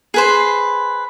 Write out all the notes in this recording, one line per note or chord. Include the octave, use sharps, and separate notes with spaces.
G#4 B4 C5